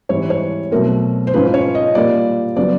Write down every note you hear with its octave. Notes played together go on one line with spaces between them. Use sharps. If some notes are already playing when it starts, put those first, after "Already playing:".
G#2 E3 G3 C4 C#5
C#5
B2 F#3 A3 C4 A#4
C5
G#2 F3 G#3 C#4 B4
C#5
D#5
A#2 G3 A#3 D5
C#3 F#3 B3 D5